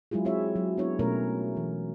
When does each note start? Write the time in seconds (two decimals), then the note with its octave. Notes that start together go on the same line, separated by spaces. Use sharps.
0.11 F#3 G#3 E4 F4 G#4
0.25 C4 E4 G#4 C#5 E5
0.56 F#3
0.78 B3 D4 E4 C#5
0.99 B2 A3 C#4 A#4 C#5
1.57 E3